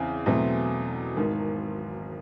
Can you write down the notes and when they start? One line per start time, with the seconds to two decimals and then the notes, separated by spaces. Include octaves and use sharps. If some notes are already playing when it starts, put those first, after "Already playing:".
Already playing: E2 C#3 E3 C4
0.26 E2 B2 F#3 A3 C4
1.17 G#1 G#2 D#3